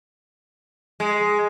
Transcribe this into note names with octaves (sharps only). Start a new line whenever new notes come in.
G#3